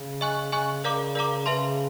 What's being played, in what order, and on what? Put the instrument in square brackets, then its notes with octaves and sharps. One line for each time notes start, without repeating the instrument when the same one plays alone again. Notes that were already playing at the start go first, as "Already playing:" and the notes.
Already playing: [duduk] C#3
[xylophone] D#5 G#5 C#6 F#6
[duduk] C#3 [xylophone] D#5 G#5 C#6 F#6
[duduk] C#3 [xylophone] A#4 D5 F5 A#5 D6
[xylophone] A#4 D5 F5 A#5 D6
[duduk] C#3 [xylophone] B4 E5 A5 C6